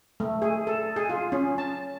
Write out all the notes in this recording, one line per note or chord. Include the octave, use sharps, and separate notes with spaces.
A3
G#4
A4
G#4
F4
C#4
A5